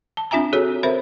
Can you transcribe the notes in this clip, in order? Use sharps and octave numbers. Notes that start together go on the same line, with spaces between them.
A5
C4 D4 F4 E5 G#5 A#5
F#4 G#4 A4 C#5
C4 A#4 C5 E5 B5